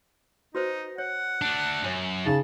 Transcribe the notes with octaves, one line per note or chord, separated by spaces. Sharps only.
D#4 F#4 B4 C5
C#5 F#5
A3 D4
F#2 C#5 G#5
C#3 D#4 A5